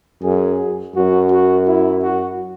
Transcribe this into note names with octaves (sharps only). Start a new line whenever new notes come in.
F#2 G#4
F#2 F#4
F#4
E4
F#4